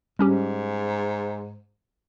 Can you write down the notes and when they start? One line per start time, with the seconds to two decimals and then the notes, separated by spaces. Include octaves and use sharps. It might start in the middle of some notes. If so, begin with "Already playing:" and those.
0.19 G#2 G3 C#4 G4